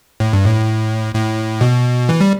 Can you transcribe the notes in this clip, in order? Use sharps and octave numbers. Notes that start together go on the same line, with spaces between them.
A2
G2
A2
A2
B2
E3
G3